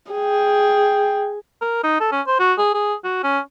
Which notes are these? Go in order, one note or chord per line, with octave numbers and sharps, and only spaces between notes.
G#4 G5
A#4
D#4
A4
C#4
C5
F#4
G#4
G#4
F#4
C#4